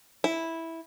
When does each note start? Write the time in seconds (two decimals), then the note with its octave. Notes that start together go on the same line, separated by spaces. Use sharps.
0.24 E4